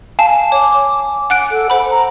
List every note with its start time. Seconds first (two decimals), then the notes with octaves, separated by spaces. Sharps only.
0.19 F5 G#5 A5
0.52 C#5 D6
1.30 F#5 F#6 D7
1.51 A4
1.70 C5 F#5 B5
1.91 A#5